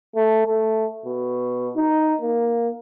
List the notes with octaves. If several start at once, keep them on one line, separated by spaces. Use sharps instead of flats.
A3
A3
B2
D#4
A#3